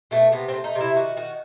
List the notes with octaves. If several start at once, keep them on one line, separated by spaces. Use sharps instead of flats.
B2 A3
C3 B3
C4
A3
D#4
C3
E4
D#3 F#4
D#3 F#4